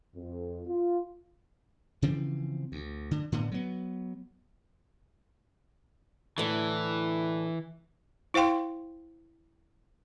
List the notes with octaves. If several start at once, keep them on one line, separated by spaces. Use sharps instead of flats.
F2
F4
C#3 E3 F3 C4
D2
D3
A2 D3 B3
F#3 B3
A2 D3 E3
E4 C5 F5 G5 C6